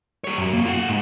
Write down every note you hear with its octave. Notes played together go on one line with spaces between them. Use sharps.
G3 C#5
F#2
C2 A#3
F4 F#5
G#2